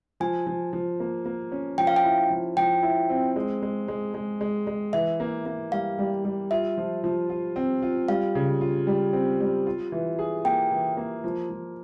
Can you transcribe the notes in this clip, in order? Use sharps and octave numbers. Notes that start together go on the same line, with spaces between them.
F3 G#5
F3
F3
A#3
A#3
C#4
F3 G5
F5
G5
E4
F3
F3 G5
E4
C4
G#3
G#3
G#3
G#3
G#3
G#3
E3 E5
A#3
A#3
G3 F5
G3
G3
F4 E5
F3
F3
F4
C4
F4
G3 F5
C#3
F4
G3
C4
G3
F4
E3
G#4
A#3 G5
E3
A#3
F3
F3